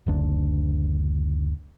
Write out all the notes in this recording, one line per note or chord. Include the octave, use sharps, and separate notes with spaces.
F#1 D2 D4